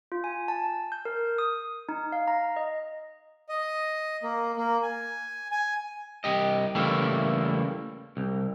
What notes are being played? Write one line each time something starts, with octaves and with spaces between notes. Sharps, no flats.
F4
G#5
A5
G6
A#4
D#6
D#4
F5
A#5
D#5
D#5
A#3
A#3
G#5
G#5
C2 G4 D#5
C#3 E3 G3 A3 A#3
C2